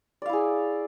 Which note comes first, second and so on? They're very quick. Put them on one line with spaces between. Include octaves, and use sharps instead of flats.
D5 F5 E4 G#4